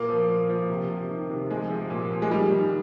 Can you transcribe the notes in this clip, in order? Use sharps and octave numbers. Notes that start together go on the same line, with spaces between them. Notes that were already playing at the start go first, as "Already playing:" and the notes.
Already playing: A#2 A#3
F3
A#2
F3
C3
C3
D#3
C3
F3 G#3
F3
A#2
F3
G#3
D#3 G3
D#3